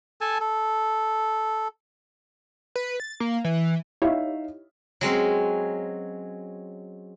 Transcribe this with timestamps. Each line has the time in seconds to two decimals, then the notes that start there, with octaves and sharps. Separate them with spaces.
0.21 A4 G#5 A5
0.40 A4
2.75 B4
3.00 A6
3.20 A#3
3.44 E3
4.02 D#4 E4 G4 C#5 E5 F5
5.01 F#3 G#3 C4 C#4